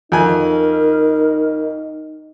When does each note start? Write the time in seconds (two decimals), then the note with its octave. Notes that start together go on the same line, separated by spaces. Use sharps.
0.12 F2 D#4 A#4 G#5